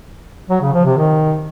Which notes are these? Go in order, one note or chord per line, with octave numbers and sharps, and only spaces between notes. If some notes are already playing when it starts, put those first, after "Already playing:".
F#3
C#3
F3
C3
D#3